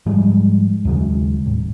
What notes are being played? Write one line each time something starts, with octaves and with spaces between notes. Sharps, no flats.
G#2 F3 G3 G#3
D#2 C#3 F#3 G#3
D#1 A2